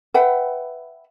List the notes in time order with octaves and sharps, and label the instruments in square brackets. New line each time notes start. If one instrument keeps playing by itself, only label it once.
[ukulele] B4 E5 F#5 G5